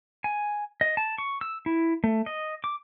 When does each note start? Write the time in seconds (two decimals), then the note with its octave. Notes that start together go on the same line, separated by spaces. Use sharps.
0.24 G#5
0.81 D#5
0.97 A5
1.18 C#6
1.41 E6
1.66 E4
2.04 A3
2.26 D#5
2.64 D6